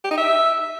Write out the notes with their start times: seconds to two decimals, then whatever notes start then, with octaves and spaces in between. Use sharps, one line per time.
0.04 G4
0.11 D#4
0.17 E5